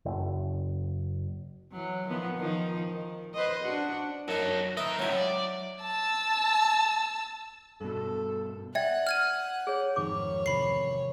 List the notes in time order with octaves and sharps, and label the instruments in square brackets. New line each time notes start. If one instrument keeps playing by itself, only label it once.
[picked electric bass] F#1
[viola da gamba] E3 F#3
D#3 F3 B3
D#3 F3 D#4
D#3
B4 C5 D#5
D4 F#4
[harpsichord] F#2 D#4 [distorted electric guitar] F#4 A4
[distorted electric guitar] A#4 D#5 [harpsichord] B4 E5
[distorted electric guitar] C#2 A2 [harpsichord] F#3 E4
[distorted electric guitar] D5
[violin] A5 E6
[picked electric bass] G2 B2 [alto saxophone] A4
[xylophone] D5 G#6 [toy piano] E5 G5 [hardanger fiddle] F#5
[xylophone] F6 G#6 D#7
[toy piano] G#4 C#5
[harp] G#1 F2 G4 [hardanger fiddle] C#5 [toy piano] D6
[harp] E2 C3 [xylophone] B5 C7